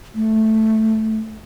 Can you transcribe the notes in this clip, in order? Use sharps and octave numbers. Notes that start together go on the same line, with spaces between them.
A3